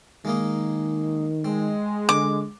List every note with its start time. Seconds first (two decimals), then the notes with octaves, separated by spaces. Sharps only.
0.25 D#3 G#3 A#3 D#4
1.45 G#3 C4
2.09 D3 D6